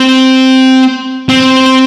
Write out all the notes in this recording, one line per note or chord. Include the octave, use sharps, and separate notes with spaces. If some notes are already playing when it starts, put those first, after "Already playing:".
Already playing: C4
C4